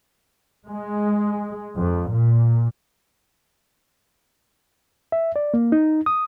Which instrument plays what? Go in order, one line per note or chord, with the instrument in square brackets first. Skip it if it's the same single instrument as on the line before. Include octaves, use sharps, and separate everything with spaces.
[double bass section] G#3
F2
A#2
[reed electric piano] E5
D5
A#3
D#4
D#6